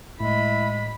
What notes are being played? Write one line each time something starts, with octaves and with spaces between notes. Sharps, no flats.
A2 G#3 E4 B5